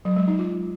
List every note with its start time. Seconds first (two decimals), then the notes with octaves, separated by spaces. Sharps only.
0.05 F#3
0.16 G#3
0.28 D#4
0.39 F4